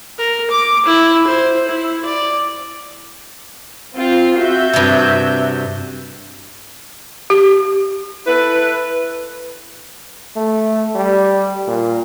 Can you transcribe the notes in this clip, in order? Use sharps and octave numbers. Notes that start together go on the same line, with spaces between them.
A#4
D6
E4
C5
E4
D5
C4 F4
F#4 E5 G6
G2 C3
G4
E4 A4 B4
A3
G3
A#2